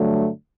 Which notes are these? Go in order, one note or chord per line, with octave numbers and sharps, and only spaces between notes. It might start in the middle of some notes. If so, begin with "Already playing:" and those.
Already playing: G2 D3 F#3 A3